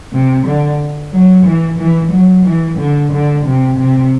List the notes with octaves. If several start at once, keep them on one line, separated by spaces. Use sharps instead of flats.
C3
D3
F#3
E3
E3
F#3
E3
D3
D3
C3
C3